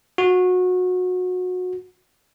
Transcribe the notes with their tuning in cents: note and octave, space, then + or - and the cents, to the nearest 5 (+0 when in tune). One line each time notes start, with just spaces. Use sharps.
F#4 -25